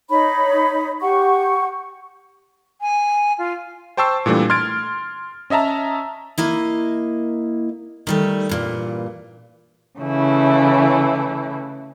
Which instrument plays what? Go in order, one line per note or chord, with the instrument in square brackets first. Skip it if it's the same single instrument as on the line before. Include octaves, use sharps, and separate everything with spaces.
[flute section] D#4 C#5 B5
G4 F#5 C#6
[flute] G#5
F4
[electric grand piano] C5 G5 A5 C#6 E6 C7
A#2 E3 G3 A3 D4
C6 F6 G#6 A6 D7
C#4 D#5 E5 A5 A#5
[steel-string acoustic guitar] A#3 E4 D#5
D#3 G3 A3
G2 A#2 E3
[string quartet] C#3 E3 A3 E4